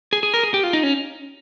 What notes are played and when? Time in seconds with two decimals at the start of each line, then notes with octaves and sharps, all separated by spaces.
0.13 G#4
0.23 G#4
0.34 A#4
0.43 G#4
0.54 G4
0.63 F4
0.73 D#4
0.83 C#4